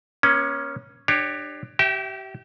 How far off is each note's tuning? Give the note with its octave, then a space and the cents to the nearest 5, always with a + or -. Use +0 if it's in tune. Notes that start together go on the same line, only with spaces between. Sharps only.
A#3 +45 C#4 +0
D4 +30 G4 +0 C#5 +0
G4 -35 E5 +0 G5 +0